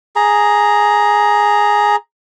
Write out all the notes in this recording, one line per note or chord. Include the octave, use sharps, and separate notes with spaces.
G#4 A#5